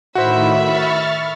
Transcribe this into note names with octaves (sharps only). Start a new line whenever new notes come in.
A2 D#3 F#4 C5 E5 B5
C#6 F6 A6